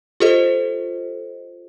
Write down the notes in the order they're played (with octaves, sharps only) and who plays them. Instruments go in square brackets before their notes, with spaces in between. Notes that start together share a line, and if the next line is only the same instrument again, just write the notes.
[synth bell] F4 G4 A4 C5 D#5